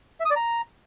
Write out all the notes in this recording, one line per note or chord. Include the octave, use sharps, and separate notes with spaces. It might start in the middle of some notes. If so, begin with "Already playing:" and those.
E5
D#6
D5
A#5